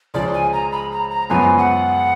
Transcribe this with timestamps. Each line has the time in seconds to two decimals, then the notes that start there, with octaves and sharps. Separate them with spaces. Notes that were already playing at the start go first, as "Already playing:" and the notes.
0.14 C#2 C#3 F3 G#3 D5
0.34 G#5
0.53 A#5
0.72 B5
0.92 A#5
1.11 A#5
1.30 F#2 C#3 F3 G#3 B3 G#5
1.58 F#5